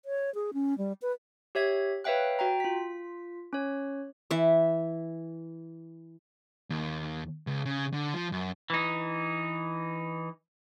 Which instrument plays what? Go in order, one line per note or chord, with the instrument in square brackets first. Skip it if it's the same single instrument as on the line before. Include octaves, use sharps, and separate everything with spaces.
[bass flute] C#5
G#4
C#4
G3
B4
[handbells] G4 C#5 E5 G#6
B4 C#5 E5 F5 G5 F#6
F#4 G5 A#5
F4 B6
C#4 C#5
[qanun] E3 E5
[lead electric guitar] D#2
C#2
C#3
D3
F3
F#2
E3 D#4